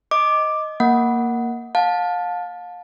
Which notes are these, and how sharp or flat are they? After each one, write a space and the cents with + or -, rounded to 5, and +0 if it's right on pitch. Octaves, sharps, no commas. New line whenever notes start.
D#5 +0 D6 +5
A#3 +0 F#5 +0
F5 +35 A5 +0